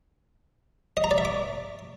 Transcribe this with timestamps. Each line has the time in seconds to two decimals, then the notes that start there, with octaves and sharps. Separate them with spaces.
0.97 D#5
1.04 A#5
1.11 D5
1.18 E5
1.25 D6